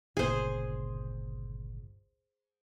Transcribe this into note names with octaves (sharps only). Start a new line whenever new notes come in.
G1 C#2 A#2 G#4 C5